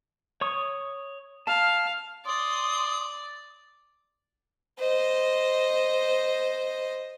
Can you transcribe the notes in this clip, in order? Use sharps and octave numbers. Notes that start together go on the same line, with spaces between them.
C#5 C#6 D#6
F5 A5
D5 C6 D#6
C5 D#5